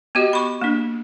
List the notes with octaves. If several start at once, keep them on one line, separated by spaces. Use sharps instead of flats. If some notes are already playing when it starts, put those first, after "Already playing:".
B3 F#4 G4 D#5
B5 C#6
A#3 D4